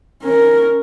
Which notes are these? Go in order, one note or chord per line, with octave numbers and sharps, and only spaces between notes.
C#4 A#4